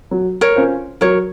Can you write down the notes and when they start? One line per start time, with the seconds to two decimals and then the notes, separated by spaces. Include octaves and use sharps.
0.11 F#3
0.41 A#4 C#5
0.56 C#4 F4 C5
1.01 F#3 A#4 C#5